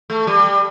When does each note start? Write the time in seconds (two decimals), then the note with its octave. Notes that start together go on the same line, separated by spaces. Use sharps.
0.10 A3
0.27 G3